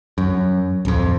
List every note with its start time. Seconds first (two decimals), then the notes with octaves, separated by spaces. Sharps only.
0.18 F#2
0.85 D1 F2